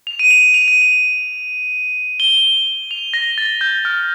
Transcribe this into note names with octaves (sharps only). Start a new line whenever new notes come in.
F7
D#7
F7
F7
D#7
F7
G7
F7
A#6
A6
G6
F6